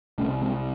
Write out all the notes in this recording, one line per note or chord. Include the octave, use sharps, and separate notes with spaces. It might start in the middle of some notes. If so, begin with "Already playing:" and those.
C2 C3 A3 C#4
G#3 C4